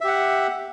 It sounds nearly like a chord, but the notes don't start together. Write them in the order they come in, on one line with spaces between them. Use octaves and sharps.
E5 G4 F#5